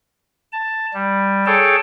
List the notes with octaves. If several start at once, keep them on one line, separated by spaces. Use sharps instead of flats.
A5
G3
G#4 A4 C#5 G5 A5